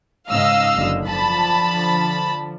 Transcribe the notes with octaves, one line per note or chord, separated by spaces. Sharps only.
G#2 C#3 D#5 F5 E6
F#1 F#2 D3
D3 F3 A5 B5